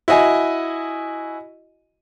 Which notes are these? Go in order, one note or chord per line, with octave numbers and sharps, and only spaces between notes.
E4 F#4 D#5 G#5